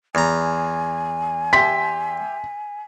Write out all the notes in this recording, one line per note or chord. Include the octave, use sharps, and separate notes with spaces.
E2 G#5 A#5
G4 E5 C6 B6